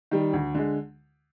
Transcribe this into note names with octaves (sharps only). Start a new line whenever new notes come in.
D#3 G3
D2
D3 G#3